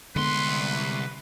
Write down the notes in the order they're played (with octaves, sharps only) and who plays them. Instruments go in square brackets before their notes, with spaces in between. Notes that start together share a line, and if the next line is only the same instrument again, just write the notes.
[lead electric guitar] C2 C6 [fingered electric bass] D3 G#3 B3 [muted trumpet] B4